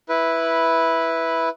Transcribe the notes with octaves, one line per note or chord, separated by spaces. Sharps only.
E4 B4